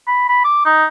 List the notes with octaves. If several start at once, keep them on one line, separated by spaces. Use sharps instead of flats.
B5
B5
D6
D#4